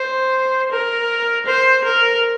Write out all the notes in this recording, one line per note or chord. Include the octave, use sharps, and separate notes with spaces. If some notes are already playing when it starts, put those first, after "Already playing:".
Already playing: C5
A#4
C5
A#4